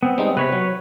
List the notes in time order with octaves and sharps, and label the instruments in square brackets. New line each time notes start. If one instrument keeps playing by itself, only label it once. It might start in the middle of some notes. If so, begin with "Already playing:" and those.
[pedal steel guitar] B3 C4
[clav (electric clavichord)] G3 G#3 D#4
[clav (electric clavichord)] C3 [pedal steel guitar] B4 C#5 B5
[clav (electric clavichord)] F#3